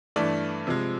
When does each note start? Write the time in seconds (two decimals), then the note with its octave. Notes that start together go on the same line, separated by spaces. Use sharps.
0.16 G2 E3 A3 D5
0.67 C3 F3 G#3